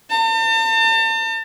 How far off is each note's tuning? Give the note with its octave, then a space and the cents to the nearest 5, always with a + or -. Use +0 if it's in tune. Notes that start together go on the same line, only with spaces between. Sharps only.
A5 +40